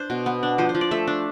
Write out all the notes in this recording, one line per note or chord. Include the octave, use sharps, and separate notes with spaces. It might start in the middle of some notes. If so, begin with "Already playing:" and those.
Already playing: D4 C5
B2
B3
D4
F3 C5
C5
F3
D5
A3 E5
D4